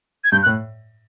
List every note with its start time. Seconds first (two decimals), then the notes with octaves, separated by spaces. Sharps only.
0.24 G#6
0.32 G2 G6
0.43 F#6
0.46 A2